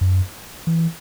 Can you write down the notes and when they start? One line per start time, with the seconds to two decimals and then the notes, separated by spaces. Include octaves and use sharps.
0.01 F#2
0.67 E3